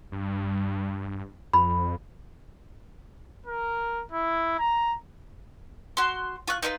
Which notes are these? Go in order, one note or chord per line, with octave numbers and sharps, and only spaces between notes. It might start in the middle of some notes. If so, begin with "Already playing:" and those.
G2
F2 B5
A#4
E4
A#5
F#4 C6
F4 C#6 F#6
D#4 F4 A#4 B4